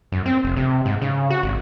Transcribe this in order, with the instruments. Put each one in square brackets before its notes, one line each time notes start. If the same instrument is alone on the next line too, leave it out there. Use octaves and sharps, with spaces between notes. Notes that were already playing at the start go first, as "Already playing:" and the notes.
[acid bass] F#2
C4
F1
C3
G#2
C#3
F#4
G#1